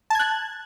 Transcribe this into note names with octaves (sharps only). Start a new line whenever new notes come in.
A5 F#6 G#6